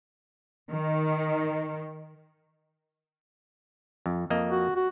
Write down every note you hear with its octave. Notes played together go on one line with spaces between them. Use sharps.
D#3
F2
F2 A#3 D#5
F#4
F#4